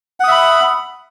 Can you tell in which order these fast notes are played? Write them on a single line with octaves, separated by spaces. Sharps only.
F#5 D#6 E5 B5